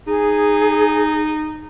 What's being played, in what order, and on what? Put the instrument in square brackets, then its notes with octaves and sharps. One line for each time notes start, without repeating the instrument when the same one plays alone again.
[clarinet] D#4 [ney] G#4